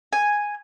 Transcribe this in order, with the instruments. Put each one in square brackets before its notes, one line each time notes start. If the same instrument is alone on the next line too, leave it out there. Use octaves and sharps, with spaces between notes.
[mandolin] G#5